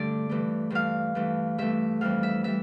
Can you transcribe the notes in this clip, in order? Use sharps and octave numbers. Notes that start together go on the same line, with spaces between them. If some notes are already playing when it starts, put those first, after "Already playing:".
Already playing: G2 D3 A3 D5
G2 E3 A3
G2 E3 A3 F5
G2 E3 A3
G2 E3 A3 E5
F2 E3 G3 F5
E5
E3 G3 E5